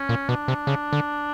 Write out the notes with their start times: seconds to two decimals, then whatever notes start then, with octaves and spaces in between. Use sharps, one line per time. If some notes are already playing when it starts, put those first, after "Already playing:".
Already playing: C#4
0.09 A#2
0.29 B2 D4
0.48 C3
0.67 C#3
0.93 D3